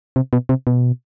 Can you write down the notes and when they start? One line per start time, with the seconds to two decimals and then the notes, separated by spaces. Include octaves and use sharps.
0.16 C3
0.33 B2
0.49 C3
0.67 B2